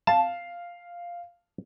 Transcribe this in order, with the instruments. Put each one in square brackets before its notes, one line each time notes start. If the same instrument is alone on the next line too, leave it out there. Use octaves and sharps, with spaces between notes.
[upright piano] F5 [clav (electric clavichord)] A5